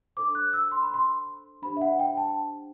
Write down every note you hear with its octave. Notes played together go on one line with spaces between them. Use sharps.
D4 A4 C5 D6
F#6
E6
C6
B5
C6
D4 G4 C5 B5
E5
F#5
G5
A5